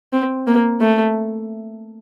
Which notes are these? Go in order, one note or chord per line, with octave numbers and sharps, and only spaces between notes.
C4
A#3
A3